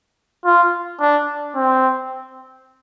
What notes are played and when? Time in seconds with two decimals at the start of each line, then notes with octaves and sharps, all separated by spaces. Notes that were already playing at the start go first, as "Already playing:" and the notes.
0.45 F4
1.00 D4
1.55 C4